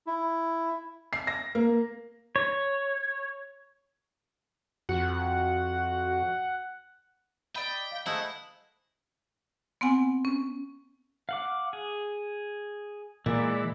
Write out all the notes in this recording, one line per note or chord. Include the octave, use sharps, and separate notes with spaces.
E4
C7
A#6
A#3
C#5
F2 F#4 F#5
D5 D#5 G5 B5
F5
G#3 A3 E4 C5 F#5
B3 C4 F#5 G#5
C#4
F5 F#5 D6
G#4
A#2 E3 G#3 D5